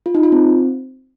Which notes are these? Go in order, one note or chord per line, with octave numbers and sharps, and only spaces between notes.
F4
D#4
F4
C4